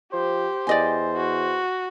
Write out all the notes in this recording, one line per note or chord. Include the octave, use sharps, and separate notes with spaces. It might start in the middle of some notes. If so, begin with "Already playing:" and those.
F3 G4 C5
E2 D5 D#5 G#5
F#4